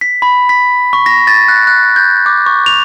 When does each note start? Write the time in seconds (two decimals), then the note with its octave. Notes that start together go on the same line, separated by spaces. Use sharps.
0.01 B6
0.22 B5
0.49 B6
0.93 C#6
1.06 A#6
1.27 A6
1.48 F#6
1.67 F#6
1.96 G6
2.26 D6
2.46 C#6
2.66 F7